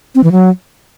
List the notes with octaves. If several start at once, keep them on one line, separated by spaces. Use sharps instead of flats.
C4
E3
F#3